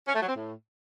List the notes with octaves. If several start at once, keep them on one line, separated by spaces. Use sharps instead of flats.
C#4
A3
F#3
C4
A2